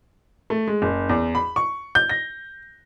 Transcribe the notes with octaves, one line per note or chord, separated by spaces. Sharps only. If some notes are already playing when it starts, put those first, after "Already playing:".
A3
G#3
F#1
E2
B5
C#6
G6
A#6